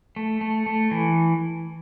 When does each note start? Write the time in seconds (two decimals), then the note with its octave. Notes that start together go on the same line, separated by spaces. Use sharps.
0.16 A3
0.41 A3
0.66 A3
0.91 E3